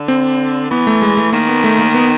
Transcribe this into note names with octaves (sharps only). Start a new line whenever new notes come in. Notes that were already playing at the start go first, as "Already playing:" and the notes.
Already playing: D3
C4
E3 B3
A3
G#3
A3
D#3 A#3
B3
A3
A#3
B3